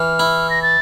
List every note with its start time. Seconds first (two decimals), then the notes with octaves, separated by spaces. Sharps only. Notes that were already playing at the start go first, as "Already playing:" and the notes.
Already playing: E3 F6
0.19 E4
0.50 A#6
0.62 A6